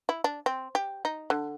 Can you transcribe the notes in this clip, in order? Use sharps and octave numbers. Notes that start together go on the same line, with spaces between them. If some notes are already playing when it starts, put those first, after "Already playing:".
E4
D4
C4
G4
D#4
D3